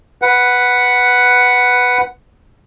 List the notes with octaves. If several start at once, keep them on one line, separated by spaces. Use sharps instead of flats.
B4 F#5